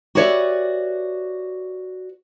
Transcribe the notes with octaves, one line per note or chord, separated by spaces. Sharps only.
F#4 G4 B4 C#5 D5 E5